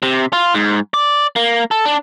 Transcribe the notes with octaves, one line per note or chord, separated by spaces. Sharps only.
C3
F4
G#2
D5
A#3
A4
D4